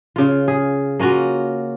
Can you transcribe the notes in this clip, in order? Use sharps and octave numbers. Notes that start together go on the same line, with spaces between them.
C#3 F4
G#4
A#3 C#4 F4 F#4